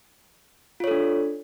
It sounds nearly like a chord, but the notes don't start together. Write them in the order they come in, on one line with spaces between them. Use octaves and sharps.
F4 C#5 A4 D4